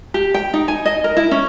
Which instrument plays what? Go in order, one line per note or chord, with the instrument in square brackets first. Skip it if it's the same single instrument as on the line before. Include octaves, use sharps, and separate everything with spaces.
[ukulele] G4
G5
D#4
G#5
D#5
A#4
E4
C#4